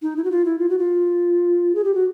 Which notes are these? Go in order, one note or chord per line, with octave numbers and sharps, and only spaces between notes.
D#4
E4
F#4
F4
E4
F4
F#4
F4
G#4
G4
F#4